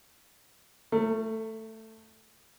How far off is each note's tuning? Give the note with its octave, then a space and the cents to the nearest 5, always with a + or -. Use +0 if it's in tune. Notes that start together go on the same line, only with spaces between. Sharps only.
A3 +10 A#4 -40